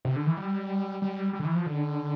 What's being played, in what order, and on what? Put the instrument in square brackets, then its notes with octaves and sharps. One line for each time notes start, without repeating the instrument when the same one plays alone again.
[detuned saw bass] C3
D3
E3
G3
G3
G3
D3
E3
F3
D3